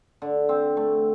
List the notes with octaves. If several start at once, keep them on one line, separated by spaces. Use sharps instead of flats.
D3
C4
A3